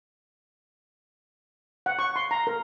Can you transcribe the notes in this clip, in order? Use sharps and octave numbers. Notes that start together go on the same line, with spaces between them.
F#5
C#6
C6
A#5
A#4